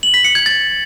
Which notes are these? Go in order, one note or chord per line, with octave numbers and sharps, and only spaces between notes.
F#7
B6
C#7
G#6
A6